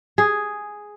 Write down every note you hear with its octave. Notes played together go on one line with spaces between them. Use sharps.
G#4